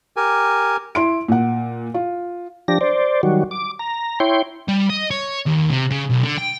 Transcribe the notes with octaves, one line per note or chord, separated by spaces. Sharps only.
G4 A#4 G#5
E4 C6 D7
A#2 F#5
F4
F3 D4 G4 A#6
C5 D5
D#3 F#3 G3 F#4
D6
A#5
E4 C#5 G5 C6
G3
D#5
C#5
D#2
C3
C#3
B1
D3
G5